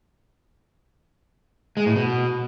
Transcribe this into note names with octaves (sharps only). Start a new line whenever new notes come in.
G#3
A2
B2